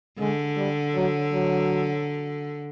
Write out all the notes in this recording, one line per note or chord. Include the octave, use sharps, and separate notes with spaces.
D3 G#3
G3
F#3
F#3